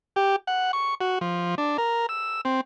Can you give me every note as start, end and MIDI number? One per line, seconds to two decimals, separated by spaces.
0.16 0.36 67
0.47 0.72 78
0.73 0.95 85
1.01 1.19 66
1.21 1.55 53
1.58 1.77 62
1.78 2.06 70
2.09 2.41 88
2.45 2.61 60